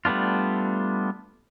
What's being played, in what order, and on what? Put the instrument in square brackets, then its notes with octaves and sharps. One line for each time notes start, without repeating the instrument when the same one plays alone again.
[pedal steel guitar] G3 A3 B3 D4 F4